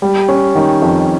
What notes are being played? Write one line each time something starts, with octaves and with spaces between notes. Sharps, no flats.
G3
C#4
D#3
F2